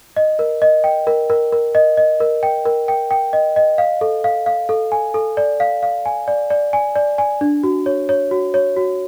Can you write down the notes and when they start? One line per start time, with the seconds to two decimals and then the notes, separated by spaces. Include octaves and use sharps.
0.17 D#5
0.39 A#4
0.62 D#5
0.84 G5
1.07 A#4
1.30 A#4
1.52 A#4
1.75 D#5
1.97 D#5
2.20 A#4
2.43 G5
2.65 A#4
2.88 G5
3.11 G5
3.33 D#5
3.56 D#5
3.78 F5
4.01 A4
4.24 F5
4.46 F5
4.69 A4
4.92 G#5
5.14 A4
5.37 D5
5.60 F5
5.83 F5
6.06 G#5
6.28 D5
6.50 D5
6.73 G#5
6.96 D5
7.18 G#5
7.41 D4
7.63 F#4
7.86 C#5
8.09 C#5
8.31 F#4
8.54 C#5
8.77 F#4